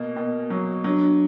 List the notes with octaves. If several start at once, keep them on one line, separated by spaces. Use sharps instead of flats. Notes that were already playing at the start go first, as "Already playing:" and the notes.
Already playing: B2 A#3
B2
F#3
F#3 D4